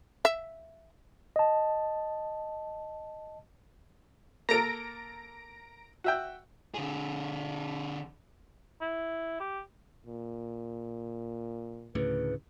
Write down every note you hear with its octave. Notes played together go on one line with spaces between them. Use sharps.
E5
D#5 A5
A#3 A4 A#4 A#5 A#6 D7
F#4 E5 G5
D3 G#4
E4
G4
A#2
D2 A2 C#3 B4